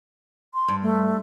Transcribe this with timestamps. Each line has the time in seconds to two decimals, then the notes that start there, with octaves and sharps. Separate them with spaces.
0.54 C6
0.68 G2
0.83 A3